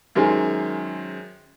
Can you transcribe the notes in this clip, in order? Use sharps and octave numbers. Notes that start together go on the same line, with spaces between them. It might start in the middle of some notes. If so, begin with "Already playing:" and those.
F#2 D#3 G#3 C5 G#5